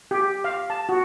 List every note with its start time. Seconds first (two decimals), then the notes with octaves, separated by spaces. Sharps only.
0.11 G4
0.44 F5
0.70 A5
0.89 F#4